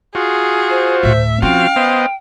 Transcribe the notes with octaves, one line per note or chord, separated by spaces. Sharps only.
F4 F#4 G#4
C5
D2 A2 E5
F3 C4 C#4 E4 F#4 F5 G5
B3 C5 D#5